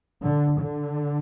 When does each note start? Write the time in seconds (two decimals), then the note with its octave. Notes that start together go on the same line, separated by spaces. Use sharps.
0.23 D3
0.59 D3